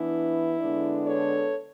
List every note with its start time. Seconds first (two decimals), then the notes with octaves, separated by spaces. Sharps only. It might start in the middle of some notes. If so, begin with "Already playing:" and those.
Already playing: E3 B3 D4 E4
0.60 D3 G#3 B3 D4
1.07 A4 C#5